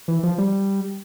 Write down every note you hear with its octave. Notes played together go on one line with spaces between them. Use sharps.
E3
F3
G3